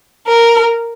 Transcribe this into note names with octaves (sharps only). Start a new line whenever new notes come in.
A#4